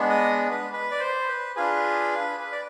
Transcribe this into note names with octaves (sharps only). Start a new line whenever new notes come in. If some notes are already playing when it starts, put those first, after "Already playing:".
Already playing: G#3 B3 D4
D#5
B4
B4
D5
C5
B4
D4 F4 G#4 B4
B4
D5